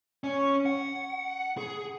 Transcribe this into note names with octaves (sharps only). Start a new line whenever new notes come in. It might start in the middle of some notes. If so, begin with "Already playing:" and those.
C#4
F#5
G#4